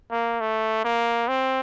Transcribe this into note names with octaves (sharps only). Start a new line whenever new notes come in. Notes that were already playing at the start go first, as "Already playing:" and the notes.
A#3
A3
A#3
C4